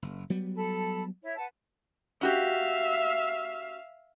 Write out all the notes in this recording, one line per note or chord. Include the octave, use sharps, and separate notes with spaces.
F#1
F#3 G3 B3
A4 A5 B5
E4 C#5 E5
B4 F#5 A5
C#4 F#4 G4 E5 F5